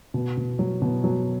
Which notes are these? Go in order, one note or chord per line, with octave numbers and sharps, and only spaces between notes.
B2
B2
F#3
B2
F#3